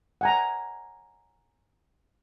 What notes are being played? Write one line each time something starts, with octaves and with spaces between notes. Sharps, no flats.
F#5 G#5 A#5